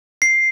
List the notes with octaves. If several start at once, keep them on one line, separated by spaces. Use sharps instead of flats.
C7